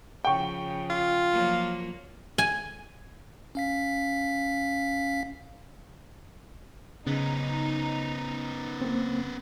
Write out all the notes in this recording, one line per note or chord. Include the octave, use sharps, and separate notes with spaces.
C#3 F3 G5 C#6
F4
F3 F#3 A#3
G#5
C#4 F5 B6
C#3 B3 C#4 D#4
A#3 C4